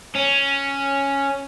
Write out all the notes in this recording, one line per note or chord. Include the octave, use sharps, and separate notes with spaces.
C#4